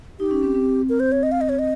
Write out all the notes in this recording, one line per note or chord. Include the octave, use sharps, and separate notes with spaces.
D#4 G4
C#4
C4
C4
A#4
C5
C#5
D#5
F5
D#5
C#5
D#5